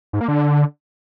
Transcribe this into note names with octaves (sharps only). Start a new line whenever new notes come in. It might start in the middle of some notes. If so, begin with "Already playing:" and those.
G#2
A#3
D3